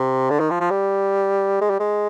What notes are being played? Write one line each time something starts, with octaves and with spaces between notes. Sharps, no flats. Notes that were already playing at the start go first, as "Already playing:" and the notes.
Already playing: C3
D3
D#3
F3
F3
G3
G#3
G3
G#3